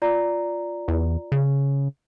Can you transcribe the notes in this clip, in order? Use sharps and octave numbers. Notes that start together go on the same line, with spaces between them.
F4 D5 A#5
E2
C#3